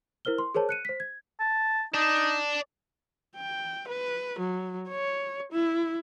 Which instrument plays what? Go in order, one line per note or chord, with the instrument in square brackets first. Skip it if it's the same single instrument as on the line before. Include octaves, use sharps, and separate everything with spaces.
[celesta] E4 A#4 C5 F6 G7
C6
G#4 A#4 C5 C#5 A5
F#6 C#7 D#7
C5 B6
G#6
[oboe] A5
[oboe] D#4 [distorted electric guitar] D5 A5
[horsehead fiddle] G5
B4
F#3
C#5
E4